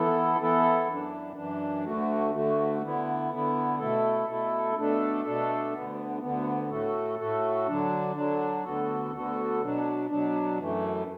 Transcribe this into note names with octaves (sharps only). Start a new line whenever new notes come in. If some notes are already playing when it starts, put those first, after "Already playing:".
Already playing: E3 B3 E4 A4
E3 B3 E4 A4
F#2 E3 D4
F#2 E3 D4
D2 D3 A3 F#4
D2 D3 A3 F#4
D3 B3 E4
D3 B3 E4
B2 A3 E4 A4
B2 A3 E4 A4
B2 A3 D4 A4
B2 A3 D4 A4
D2 D3 B3
D2 D3 B3
A2 A3 F#4 A4
A2 A3 F#4 A4
D3 F#3 D4
D3 F#3 D4
D2 D3 B3 F#4 A4
D2 D3 B3 F#4 A4
B2 F#3 D4
B2 F#3 D4
F#2 E3 A3